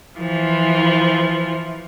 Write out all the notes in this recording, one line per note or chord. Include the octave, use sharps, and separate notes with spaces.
E3 F3